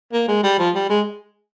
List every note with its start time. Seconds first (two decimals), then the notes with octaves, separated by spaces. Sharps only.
0.13 A#3
0.28 G#3
0.43 G3
0.59 F3
0.75 G3
0.89 G#3